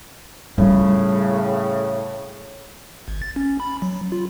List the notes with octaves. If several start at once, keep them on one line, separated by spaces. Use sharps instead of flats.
A2 C#3 G3 F4
G#1
A6
C#4
B5
F#3
F4